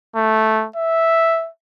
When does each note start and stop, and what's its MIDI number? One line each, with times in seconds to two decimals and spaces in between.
0.16 0.66 57
0.76 1.49 76